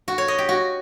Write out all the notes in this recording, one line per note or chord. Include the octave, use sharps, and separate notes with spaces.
F#4
C#5
D#5
G4
F#4